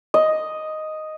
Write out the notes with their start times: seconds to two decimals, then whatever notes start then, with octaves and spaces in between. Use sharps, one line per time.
0.14 D#5